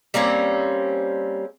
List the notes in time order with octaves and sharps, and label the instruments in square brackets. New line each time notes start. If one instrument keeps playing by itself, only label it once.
[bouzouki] G3 A#3 C4 C#4